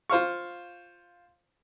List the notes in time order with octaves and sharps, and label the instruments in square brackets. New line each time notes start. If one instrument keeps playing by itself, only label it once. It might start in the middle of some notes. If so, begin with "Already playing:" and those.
[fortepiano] F4 C5 F5 C#6